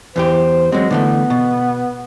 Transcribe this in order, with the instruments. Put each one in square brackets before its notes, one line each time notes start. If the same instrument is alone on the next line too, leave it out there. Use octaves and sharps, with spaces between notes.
[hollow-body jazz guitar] E2 E3 G4 [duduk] C5
[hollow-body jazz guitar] F#3 C4 [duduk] G#3
[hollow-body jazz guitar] D3 E3 A3 [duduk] B3
[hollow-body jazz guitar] B2